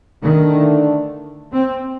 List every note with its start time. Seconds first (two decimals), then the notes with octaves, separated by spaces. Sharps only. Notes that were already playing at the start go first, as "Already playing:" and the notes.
0.24 D3 D#3 A3 D4
1.52 C4